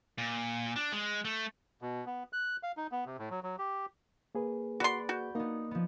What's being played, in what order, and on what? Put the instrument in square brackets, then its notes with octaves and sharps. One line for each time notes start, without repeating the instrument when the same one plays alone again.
[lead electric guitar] A#2
D4
G#3
A3
[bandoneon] B2
B3
F#6
F5
D#4
B3
C3
A2
F#3
F#3
G4
[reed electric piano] A#3 G#4 B4
[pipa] F#4 C6 [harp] D5 F#5 B5
[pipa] F#4 [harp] G6
[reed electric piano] A#3 [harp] B3 D#4
[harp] F3 B3